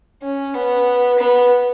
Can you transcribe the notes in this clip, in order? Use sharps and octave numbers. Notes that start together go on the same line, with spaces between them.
C#4
B3
B3